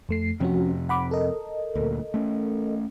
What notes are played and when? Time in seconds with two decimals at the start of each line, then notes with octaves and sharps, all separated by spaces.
0.09 F2 A3 C7
0.40 F2 C3 F3 C#4 F#4
0.89 F#5 B5 D6
1.11 A4 A#4 D#5
1.75 D2 A#2
2.14 A3 C#4